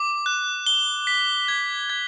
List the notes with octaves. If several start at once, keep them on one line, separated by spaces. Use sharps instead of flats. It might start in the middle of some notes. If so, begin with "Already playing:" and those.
Already playing: D6
F#6
G7
B6
G#6
G#6